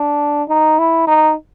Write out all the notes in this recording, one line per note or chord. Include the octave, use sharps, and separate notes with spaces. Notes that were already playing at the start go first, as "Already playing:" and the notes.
Already playing: D4
D#4
E4
D#4